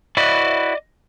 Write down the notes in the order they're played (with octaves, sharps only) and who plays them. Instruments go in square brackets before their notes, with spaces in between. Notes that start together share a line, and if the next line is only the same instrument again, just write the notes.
[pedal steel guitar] E4 F#4 B4 [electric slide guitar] D5 D#5